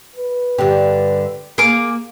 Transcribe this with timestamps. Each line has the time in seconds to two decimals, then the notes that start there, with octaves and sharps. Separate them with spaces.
0.16 B4
0.58 G2 D3 G4
1.58 A#3 G#4 D6